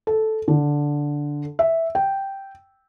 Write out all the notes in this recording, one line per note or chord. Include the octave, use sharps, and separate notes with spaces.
A4
D3
E5
G5